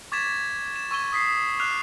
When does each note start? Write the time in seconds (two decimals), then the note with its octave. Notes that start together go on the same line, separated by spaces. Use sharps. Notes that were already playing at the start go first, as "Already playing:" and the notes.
0.12 C#6 D6 G#6 A6 B6 E7
0.76 E7
0.91 C#6 E6 G#6 D#7 G7
1.13 D#6 B6 C7
1.59 D6 F6 F#6 C7 E7 F7